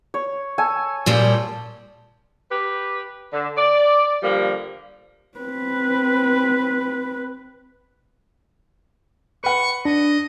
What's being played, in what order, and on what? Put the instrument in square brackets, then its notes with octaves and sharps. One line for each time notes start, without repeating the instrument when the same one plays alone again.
[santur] C#5
A4 G#5
[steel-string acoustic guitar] A#2 F3 G3
[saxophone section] G4 B4
D3
D5
D3 F3 G3 A#3
[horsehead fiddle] C4 B4
[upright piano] B4 F#5 [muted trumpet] C#6
[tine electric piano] D4 [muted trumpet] D#5